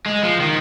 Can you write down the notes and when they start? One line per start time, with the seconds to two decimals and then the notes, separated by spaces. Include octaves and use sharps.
0.06 G#3
0.23 F3
0.40 D#3